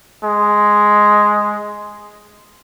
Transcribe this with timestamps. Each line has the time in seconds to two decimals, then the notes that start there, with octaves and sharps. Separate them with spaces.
0.24 G#3